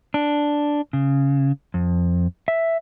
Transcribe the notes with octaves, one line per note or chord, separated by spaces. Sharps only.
D4
C#3
F2
E5